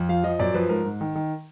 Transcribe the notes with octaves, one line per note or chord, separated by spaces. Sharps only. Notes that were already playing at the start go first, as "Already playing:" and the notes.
Already playing: F2
F3 F5
F3 D#5
F#2 D5
F3 B4
G#2 A#4
G#2
D#3
D#3